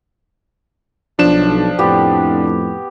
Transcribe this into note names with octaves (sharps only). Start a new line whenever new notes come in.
B1 F3 D4 E7
F2 A2 B3 G4